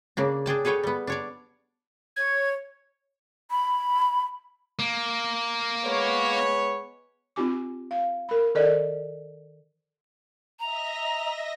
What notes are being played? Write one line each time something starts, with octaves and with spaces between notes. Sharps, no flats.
C#3 A#3 D4
D4 G#4 G5 A5
G#4 A4 B4 C#5 G5
G3 B3
D4 C#5 D5
C#5 G#6
B5
A#3
G#3 B3 C#5
C4 D#4 F4 G4 G#5 D6
F5
A#4 B5
D#3 A4 A#4 C5 D5 D#5
D#5 E5 A#5 A#6